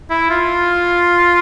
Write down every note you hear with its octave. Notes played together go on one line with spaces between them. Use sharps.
E4
F4